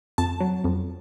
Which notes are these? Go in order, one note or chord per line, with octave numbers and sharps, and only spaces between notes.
F2 A5
F#3
F2